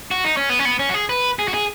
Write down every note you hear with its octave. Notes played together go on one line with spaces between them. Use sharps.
F#4
D#4
C#4
B3
C#4
B3
C#4
F#4
G#4
B4
G#4
F#4
G#4